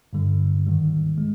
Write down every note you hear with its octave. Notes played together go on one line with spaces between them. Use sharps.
G2 D3 G3
G#2 D#3 G3
G#3